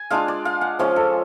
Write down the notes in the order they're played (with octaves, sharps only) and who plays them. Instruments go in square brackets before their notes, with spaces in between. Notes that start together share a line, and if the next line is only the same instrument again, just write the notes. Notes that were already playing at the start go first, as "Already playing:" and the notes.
Already playing: [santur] G#5
G#3 D4 F4 F5
D5
F5
F#5
F3 G#3 C#4 F4 F5
A4